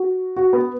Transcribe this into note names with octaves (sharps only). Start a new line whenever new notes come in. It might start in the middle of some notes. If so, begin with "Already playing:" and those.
Already playing: F#4
F#4
B3